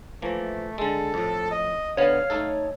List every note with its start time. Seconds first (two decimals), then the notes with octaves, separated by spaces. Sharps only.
0.22 E3 F3 A3 A#3
0.78 D3 G#3 A4
1.14 F2 A2
1.51 D#5
1.97 D3 B3 C#5 F5
2.30 A3 D#4 A4